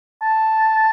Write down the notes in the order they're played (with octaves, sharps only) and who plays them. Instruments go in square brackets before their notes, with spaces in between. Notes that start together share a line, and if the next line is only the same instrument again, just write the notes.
[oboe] A5